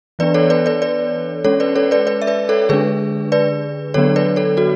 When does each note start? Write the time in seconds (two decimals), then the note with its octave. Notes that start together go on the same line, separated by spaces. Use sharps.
0.19 E3 B3 D4 B4 D5
0.34 A4 C#5
0.50 B4 D5
0.66 B4 D5
0.82 B4 D5
1.44 G#3 C#4 A4 C#5
1.60 B4 D5
1.75 A4 C#5
1.91 B4 D5
2.07 B4 D5
2.22 E5
2.27 B4 D5
2.49 A4 C#5
2.69 D3 G#3 D4 G#4 B4
3.32 B4 D5
3.94 D3 F#3 B3 D4 A4 C#5
4.16 B4 D5
4.36 A4 C#5
4.57 F#4 A4